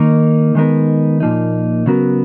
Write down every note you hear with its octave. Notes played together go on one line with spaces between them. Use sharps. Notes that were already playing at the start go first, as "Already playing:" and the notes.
Already playing: D#3 A#3 D#4 A#4
D#3 G#3 B3 D#4 A#4
A#2 F3 A#3 D#4
C#3 F#3 B3 F#4 A#4